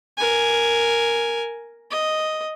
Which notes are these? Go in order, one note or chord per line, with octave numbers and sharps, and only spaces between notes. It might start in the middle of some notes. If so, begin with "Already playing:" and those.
A#4 G#5
D#5